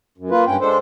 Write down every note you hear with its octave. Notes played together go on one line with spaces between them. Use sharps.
F#2
A#3 F4 B4
G2 C#4 G5
G#3 D4 A4 C5